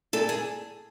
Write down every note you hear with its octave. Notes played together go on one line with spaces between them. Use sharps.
A#2 A4
G#4